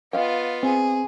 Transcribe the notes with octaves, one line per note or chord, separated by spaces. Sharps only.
B3 F4 D#5 F5 G5
C4 G#4